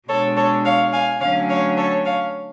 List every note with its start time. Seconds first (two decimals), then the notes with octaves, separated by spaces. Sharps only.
0.09 B2 G#3 D4 A4 C#5
0.37 A4 C#5
0.65 C#5 F5
0.93 F5 G#5
1.21 D3 F#3 A3 C#4 C#5 F5
1.49 C#5 F5
1.77 A4 C#5
2.05 C#5 F5